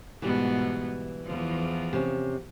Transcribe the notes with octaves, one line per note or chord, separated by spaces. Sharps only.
G#2 B2 E3 G3 B3
E2 F3
C3 C#4